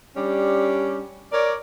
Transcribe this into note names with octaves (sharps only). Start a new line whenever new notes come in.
G3 C#4 D4 G4
A#4 C#5 D5